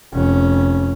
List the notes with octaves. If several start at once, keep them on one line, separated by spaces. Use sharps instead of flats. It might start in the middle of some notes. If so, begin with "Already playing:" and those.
F1 C#4